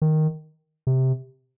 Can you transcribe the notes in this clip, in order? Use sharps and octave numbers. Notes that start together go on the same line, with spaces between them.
D#3
C3